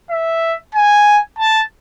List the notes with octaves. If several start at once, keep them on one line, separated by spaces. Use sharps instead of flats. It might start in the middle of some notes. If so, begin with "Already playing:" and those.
E5
G#5
A5